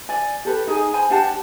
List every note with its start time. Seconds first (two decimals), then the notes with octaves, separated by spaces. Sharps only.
0.09 D5 G#5
0.45 G4 A4 B4
0.67 D#4 G#4 G#5
0.94 C5 G#5 B5
1.10 D4 G4 F#5 A5